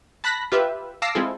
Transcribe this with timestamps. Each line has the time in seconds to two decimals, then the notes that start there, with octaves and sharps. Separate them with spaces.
0.24 A5 B5 F#6 A#6 B6
0.52 F4 G4 B4 E5
1.02 F5 A5 D6 E6 A#6 C7
1.15 G#3 C4 E4 F4 G#4 A4